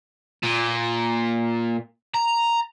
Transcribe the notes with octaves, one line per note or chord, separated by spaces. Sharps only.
A#2
A#5